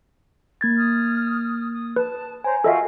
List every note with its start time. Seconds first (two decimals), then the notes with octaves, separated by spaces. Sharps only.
0.61 A#3 G#6 A6
0.77 D#6 F6
1.73 D#6
1.96 B4 A5
2.44 C5 C#5 G#5 A#5
2.64 F4 F#4 A4 A#4 D#5 E5